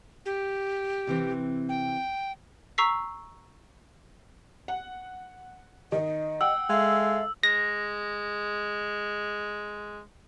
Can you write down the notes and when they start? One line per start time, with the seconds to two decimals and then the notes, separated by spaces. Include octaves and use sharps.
0.26 G4
1.07 C3 E3 C4
1.69 G5
2.78 A#5 C#6 E6 B6 C7
4.68 F#5
5.92 D#3 D#4 D#5
6.41 F#5 G5 E6
6.70 G#3 A4 E5 F5
7.43 G#3 A#6